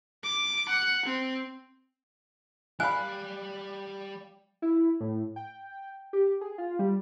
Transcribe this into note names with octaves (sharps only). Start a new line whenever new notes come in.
D6
F#5
C4
G3 D5 F5 G#5 B5 F#6
E4
A2
G5
G4
G#4
F4
G3